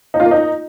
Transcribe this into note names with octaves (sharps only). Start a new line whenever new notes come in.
D#4
F4
A#3
D#4